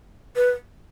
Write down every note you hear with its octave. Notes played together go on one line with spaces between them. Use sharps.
B4